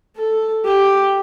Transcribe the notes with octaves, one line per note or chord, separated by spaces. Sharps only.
A4
G4